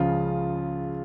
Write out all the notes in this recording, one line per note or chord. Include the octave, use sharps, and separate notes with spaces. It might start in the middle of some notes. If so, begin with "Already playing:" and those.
Already playing: C#2 C#3 F3 F4